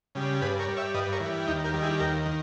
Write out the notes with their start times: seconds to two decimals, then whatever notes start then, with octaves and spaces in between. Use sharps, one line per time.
0.15 C#3 G3
0.42 G2 G#4 B4
0.59 A#4 C#5
0.68 G3
0.77 C#5 E5
0.94 G2 B4 D#5
1.12 A#4 C#5
1.20 E3
1.26 G3
1.47 D#2 D#4 G4
1.64 G4 A#4
1.74 D#3 G3
1.82 E4 G#4
2.00 D#2 G4 A#4
2.26 D#3